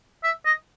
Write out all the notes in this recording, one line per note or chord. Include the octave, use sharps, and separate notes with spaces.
E5
D#5